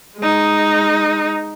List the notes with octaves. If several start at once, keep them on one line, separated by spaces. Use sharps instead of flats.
G#3 D#4